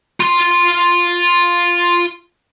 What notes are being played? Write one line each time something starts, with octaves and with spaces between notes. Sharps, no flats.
F4 C6